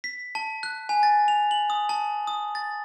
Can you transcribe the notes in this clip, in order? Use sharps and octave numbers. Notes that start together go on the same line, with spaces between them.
B6
A5
F#6
G#5
A6
F7
F#7
D#6
A5
D#6
A6